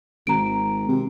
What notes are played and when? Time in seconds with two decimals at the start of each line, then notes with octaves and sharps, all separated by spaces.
0.27 G#1 A#5 D7
0.89 C3